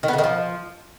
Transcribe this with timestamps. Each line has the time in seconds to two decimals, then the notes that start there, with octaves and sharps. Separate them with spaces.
0.03 D#3
0.08 B3
0.13 C#3
0.18 D#3
0.23 F3